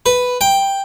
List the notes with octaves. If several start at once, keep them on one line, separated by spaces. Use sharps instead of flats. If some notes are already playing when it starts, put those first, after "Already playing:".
B4
G5